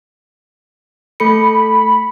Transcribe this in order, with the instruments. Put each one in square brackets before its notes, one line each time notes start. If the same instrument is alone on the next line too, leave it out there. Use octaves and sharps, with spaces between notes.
[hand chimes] A3 A4 C#7 [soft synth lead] B5